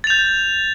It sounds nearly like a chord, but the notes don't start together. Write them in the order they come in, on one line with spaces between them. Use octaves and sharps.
A6 F7 G6